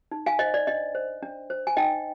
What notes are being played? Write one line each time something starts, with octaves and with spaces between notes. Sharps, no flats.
D#4
F5 G#5
C5 D#5
D5
D4 D#5
C5
D4
C5
G#5
D#4 D#5 G5